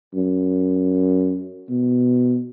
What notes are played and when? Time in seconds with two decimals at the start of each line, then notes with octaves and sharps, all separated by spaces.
0.15 F#2
1.70 B2